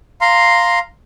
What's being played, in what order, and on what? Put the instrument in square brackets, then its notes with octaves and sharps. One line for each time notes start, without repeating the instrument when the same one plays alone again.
[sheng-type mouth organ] F5 A#5 C6